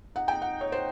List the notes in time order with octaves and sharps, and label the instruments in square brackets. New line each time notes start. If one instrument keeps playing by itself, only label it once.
[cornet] D#4 [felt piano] F#5
[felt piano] G5
F#5
C#5
C5